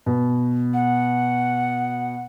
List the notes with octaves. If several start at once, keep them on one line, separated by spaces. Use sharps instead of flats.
B2
F#5